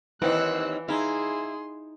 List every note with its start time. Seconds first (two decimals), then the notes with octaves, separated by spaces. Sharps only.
0.22 D#2 E3 C4 D#4 D5 F#5 E6 F#6
0.88 D#4 E4 G#4 F5 C6